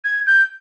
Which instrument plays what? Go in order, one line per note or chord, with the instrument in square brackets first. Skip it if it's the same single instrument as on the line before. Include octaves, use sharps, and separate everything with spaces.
[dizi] G#6
G6